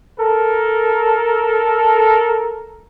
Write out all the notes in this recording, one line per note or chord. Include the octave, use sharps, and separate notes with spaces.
A4 A#4